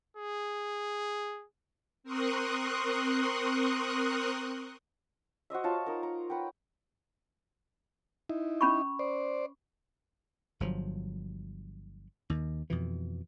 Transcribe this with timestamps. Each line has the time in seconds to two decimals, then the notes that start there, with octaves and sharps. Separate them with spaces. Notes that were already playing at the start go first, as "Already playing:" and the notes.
0.17 G#4
2.03 C4 A#4 C6 C#6 D#6 F#6
5.50 F#4 C5 D#5 E5
5.64 F4 C#5 A5
5.86 D#4 A#4
6.03 A#5
6.30 B4 F#5 G5
8.29 D#4 E4
8.61 C#4 B5 C#6
8.99 C5 D5
10.60 G1 F3 F#3
12.30 D#2 D#3
12.70 F2 B2 E3